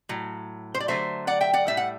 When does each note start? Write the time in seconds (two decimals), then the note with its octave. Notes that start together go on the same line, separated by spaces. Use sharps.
0.09 A2 F#3
0.74 C5
0.80 D5
0.88 D3 F#3 A3 C5 E5
1.27 D5 F#5
1.41 E5 G5
1.53 D5 F#5
1.67 A2 G3 E5
1.77 F#5